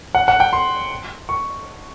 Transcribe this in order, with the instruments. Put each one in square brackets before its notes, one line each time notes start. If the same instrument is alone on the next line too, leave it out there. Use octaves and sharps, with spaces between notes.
[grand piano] F#5
F#5
G5
C6
C#6